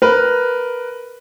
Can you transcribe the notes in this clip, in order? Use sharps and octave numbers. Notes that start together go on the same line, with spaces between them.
A#4 B4